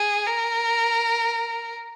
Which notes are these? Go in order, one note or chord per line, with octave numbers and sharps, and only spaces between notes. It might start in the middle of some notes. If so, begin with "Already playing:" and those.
Already playing: G#4
A#4